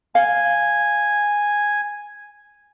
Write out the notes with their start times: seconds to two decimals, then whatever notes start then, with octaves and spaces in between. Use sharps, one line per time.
0.15 F5 G#5